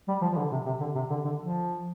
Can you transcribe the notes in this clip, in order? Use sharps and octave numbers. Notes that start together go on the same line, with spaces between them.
G3
F3
F3
D3
C3
C3
D3
C3
D3
D3
F3